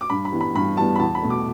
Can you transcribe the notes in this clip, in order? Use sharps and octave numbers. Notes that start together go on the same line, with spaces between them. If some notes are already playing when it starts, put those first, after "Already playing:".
D6
G2 B5
B5
E3 G3 B3
B5
G2 B5
E3 G3 B3 A5
B5
E2 A5
B5
B2 A3
D6